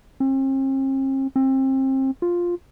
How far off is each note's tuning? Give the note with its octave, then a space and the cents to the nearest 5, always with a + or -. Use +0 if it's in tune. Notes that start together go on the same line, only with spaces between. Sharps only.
C4 +45
C4 +30
F4 +5